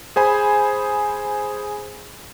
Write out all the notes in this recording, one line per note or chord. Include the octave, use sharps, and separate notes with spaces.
G#4 C5 G#5 B5